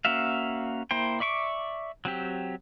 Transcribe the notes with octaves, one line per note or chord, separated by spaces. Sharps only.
A#3 C#4 F#4 E5 F5
A#3 E4 C5 G5
D5 E5 C#6 D6
F#3 C4 G4